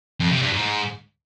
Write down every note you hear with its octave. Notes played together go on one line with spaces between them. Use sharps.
F2
C3
G2
G#2